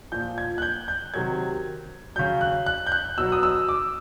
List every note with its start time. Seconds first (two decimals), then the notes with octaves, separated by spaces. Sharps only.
0.12 A#2 F3 G6
0.38 G#6
0.58 F#6
0.62 G6
0.88 G6
1.14 C3 D#3 F#3 G#6
2.16 C#3 F#3 G6
2.41 F#6
2.66 F#6
2.87 G6
2.92 F#6
3.18 B2 F#3 E6
3.32 D#6
3.43 E6
3.69 D6